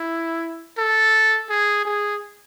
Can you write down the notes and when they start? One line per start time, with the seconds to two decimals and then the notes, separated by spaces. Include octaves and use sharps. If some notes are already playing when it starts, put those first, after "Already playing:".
Already playing: E4
0.78 A4
1.50 G#4
1.86 G#4